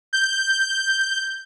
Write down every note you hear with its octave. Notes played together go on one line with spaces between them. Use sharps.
G6